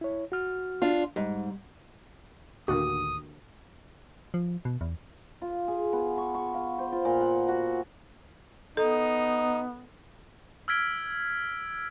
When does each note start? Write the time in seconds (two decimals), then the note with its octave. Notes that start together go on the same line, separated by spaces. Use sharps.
0.01 E4 C#5
0.32 F#4 F6
0.82 D4 F4
1.16 G#2 G3
2.68 D2 A2 D3 D#3 A#3 F#4 G4 D#6
4.34 F3
4.65 B2
4.81 E2
5.42 F4
5.68 G#4
5.93 B3
6.18 C#6
6.34 C#6
6.54 F5
6.79 C5
6.92 F4
7.05 A#2
7.21 F#5
7.48 F#4
8.77 B3 D#4 A4
10.68 E6 F6 G#6 B6 D7 G7